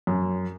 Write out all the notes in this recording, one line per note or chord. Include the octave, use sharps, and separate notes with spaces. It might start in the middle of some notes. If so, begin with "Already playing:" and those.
F#2